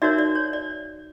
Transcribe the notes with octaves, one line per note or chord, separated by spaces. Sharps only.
D#4 F#4 A#4 C#5 D5 E5
D5
C#5
D5